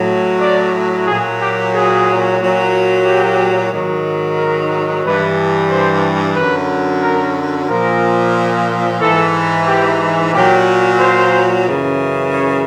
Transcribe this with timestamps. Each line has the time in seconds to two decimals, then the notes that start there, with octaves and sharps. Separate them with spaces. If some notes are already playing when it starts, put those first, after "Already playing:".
Already playing: A2 F#3
0.40 D5
1.07 A#2 F#3 G#4
1.40 G4
1.73 G#4
2.39 A#2 F#3
3.05 G4
3.71 G#2 D#3 F#3
4.37 A#4
5.03 G2 E3 B4
5.70 C5
6.36 F#2 D3 F#3 B4
7.02 A#4
7.68 A#2 F3 A#4
9.00 G#2 E3 A4
9.66 G4
10.32 A#2 F#3 G4
10.99 C5
11.65 F#2 C#3 E3
12.32 C#5